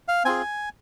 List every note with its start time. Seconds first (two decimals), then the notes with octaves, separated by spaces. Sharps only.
0.08 F5
0.25 C4 F4 G#4 G#5